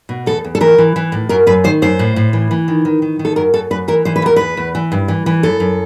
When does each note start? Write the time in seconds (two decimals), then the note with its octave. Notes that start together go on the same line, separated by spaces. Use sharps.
0.09 B2
0.26 E2 A4
0.44 E2
0.55 A4
0.61 E3 A#4
0.78 E3
0.96 E3
1.12 A2
1.29 F#2 A#4
1.47 F#2 B4
1.64 D#3 C5
1.82 F#2 C5
1.99 A2
2.16 A2
2.33 E3
2.51 E3
2.68 D#3
2.85 D#3
3.02 D#3
3.19 D#3
3.25 A4
3.36 F#2 A#4
3.54 F#2 A4
3.71 F#2 B4
3.88 E3 A#4
4.05 E3 C5
4.16 B4
4.22 E2 A#4
4.36 E2 B4
4.57 E2
4.75 E3
4.92 G2
5.08 E3
5.26 E3
5.43 F#2 A4
5.60 F#2